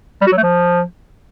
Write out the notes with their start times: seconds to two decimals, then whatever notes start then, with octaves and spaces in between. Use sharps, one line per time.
0.21 G3
0.27 F#4
0.32 F#3
0.38 A3
0.43 F3